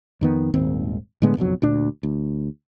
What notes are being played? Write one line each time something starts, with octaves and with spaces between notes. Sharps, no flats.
F2 D#3 B3
D#1 G#1 D#2 C4
A2 D3 G#3 B3
F#1 B1 F2 F#3
D2 A#2 D4
D2